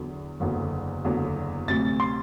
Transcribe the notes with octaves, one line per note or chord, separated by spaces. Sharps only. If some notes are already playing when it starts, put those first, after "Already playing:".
Already playing: E2 D3 F#3
F#1 E2 D3 F#3
F#1 E2 D3 F#3
D2 C3 F#3 A6
C6